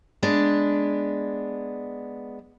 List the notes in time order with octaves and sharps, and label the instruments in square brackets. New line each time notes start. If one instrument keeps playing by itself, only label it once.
[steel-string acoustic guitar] G#3 B3 D4